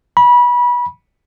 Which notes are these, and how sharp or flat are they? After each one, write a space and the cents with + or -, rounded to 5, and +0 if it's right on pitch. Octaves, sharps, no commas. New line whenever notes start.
B5 -25